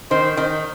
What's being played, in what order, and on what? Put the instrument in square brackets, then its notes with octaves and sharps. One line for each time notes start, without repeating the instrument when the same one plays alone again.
[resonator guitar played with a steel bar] D#3 [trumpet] C5
[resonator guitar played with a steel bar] D#3